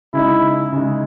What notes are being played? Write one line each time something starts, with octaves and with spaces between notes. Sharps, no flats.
C#3 G#3 D#4 E4
C#3 G#3 D#4